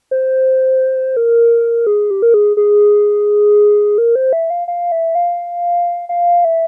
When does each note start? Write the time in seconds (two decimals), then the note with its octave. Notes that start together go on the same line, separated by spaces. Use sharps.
0.11 C5
1.17 A#4
1.87 G#4
2.11 G4
2.22 A#4
2.34 G#4
2.57 G#4
3.98 A#4
4.15 C5
4.33 E5
4.50 F5
4.68 F5
4.92 E5
5.15 F5
6.09 F5
6.45 E5